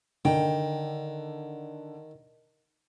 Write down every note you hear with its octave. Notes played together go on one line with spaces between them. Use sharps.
D3 D#3 G5